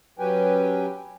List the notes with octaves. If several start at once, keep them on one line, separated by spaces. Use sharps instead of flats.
F#3 C#4 G4 B4 G5 G#5